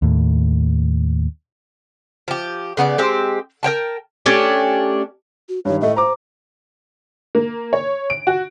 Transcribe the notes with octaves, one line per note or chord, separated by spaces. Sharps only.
D#2 A2
F3 G4
C#3 B3 A4 D5
G#3 C4 G4
A#4 C#5 G5 A5
A3 C#4 D4 G4
F#4
G2 D#3 C#5
A2 A3 D#5
C5 A#5 D6
A#3
C#5
D7
F#4